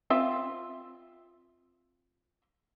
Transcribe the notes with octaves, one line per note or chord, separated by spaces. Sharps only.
C4 F4 E5